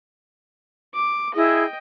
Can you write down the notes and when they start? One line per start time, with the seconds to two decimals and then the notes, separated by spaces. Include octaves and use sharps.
0.94 D6
1.35 E4 G#4 D#5 G5